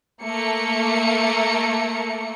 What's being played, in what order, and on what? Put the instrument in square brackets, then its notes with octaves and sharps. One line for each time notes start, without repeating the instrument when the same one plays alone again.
[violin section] A3 A#3 C#7